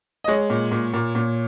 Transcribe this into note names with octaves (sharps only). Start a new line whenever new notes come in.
D#5
G#3 C#5
A#2
A#2
A#2
A#2